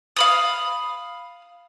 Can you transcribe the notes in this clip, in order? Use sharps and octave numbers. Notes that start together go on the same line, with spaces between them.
F5 B5 D#6